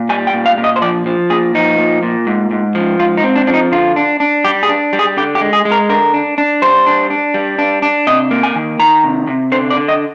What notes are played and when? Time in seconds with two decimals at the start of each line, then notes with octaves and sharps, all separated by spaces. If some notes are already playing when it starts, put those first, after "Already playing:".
Already playing: A#2
0.09 G3 G#5
0.27 G5
0.33 A#2
0.46 F5
0.58 A#2
0.64 D#5
0.76 C5
0.82 F3 D5
1.06 F3
1.30 A#2 G#4
1.55 F3 D#4
1.78 A#2
2.03 A#2
2.27 G#2
2.51 G#2
2.75 F3
2.99 G#2 F4
3.17 D#4
3.24 C4
3.36 D4
3.47 F3 D4
3.54 D#4
3.72 D3 F4
3.96 D4
4.20 D4
4.45 G3 G4
4.63 G#4
4.69 D4
4.93 G3
4.99 G#4
5.17 D3 G4
5.35 G4
5.41 G#3
5.53 G#4
5.65 G#3
5.72 A#4
5.89 D3 A#4
6.14 D4
6.38 D4
6.62 G3 C5
6.86 D4
7.10 D4
7.34 G3
7.59 D4
7.82 D4
8.07 C3 D#5
8.31 A#3
8.43 G#5
8.55 D#3
8.79 D#3 A#5
9.04 C3
9.27 C3
9.52 D3 C5
9.70 D5
9.77 D3
9.88 D#5